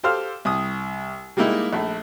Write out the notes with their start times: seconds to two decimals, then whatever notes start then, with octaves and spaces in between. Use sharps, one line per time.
0.04 G4 A4 C5 F5 F6
0.45 C2 D#6
1.37 G3 G#3 A#3 D#4 E4
1.73 A#1 A3